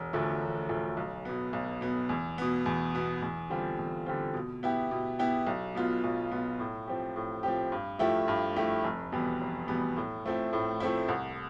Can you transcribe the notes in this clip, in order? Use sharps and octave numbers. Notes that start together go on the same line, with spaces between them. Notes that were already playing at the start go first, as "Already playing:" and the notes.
Already playing: E1
D2 D3 F3 A3
E1
D2 D3 F3 A3
B1
B2 B3
B1
B2 B3
E2
B2 B3
E2
B2 B3
E2
D3 G3 C4 F4
E2
D3 G3 C4 F4
B2
B3 E4 G4
B2
B3 E4 G4
B1
B2 B3 F4
B1
B2 B3 F4
A2
F3 C4 G4
A2
F3 C4 G4
G2
F3 A3 E4 G4
G2
F3 A3 E4 G4
F1
E2 B2 G3 B3
F1
E2 B2 G3 B3
A2
F3 A3 C4 E4
A2
F3 A3 C4 E4
C2